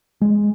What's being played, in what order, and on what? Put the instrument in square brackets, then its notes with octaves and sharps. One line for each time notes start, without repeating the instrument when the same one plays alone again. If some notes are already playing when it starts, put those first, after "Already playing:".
[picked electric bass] G#3